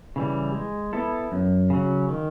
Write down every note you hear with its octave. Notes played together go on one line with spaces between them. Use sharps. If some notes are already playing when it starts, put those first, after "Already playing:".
C#3 E3 G3
G#3
B3 E4 A4
F#2
C#3 F#3
D#3